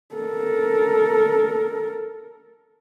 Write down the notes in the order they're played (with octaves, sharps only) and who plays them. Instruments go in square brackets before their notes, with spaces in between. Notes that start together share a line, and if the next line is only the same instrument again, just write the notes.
[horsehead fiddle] A4 A#4